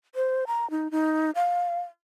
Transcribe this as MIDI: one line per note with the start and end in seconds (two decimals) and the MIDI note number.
0.15 0.44 72
0.47 0.69 82
0.70 0.91 63
0.91 1.31 63
1.35 1.80 77